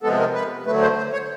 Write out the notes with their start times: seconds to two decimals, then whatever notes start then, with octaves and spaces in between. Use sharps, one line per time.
0.03 C3 F3 G#3 B3 A4
0.20 A#4
0.34 B4
0.66 D3 F#3 A3 B4
0.81 C5
0.97 C5
1.13 C#5